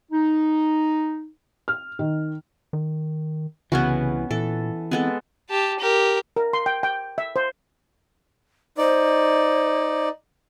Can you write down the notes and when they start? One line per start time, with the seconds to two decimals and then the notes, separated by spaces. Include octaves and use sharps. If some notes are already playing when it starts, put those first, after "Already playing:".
0.12 D#4
1.68 F6
1.99 D#3
2.73 D#3
3.72 C2 C#3 E3 B3 C#4 F#4
4.31 A#2 E3 A4
4.91 G#3 B3 C4 A4
5.49 G4 A5
5.79 G4 A#4
6.36 A#4
6.53 C6
6.66 G5
6.83 G5
7.18 E5
7.36 C5
8.78 D#4 C5 D5